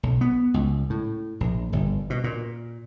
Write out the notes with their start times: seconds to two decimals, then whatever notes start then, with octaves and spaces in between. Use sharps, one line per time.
0.03 B1
0.21 B3
0.54 C#2
0.90 A2
1.40 A#1
1.73 G1
2.10 B2
2.24 A#2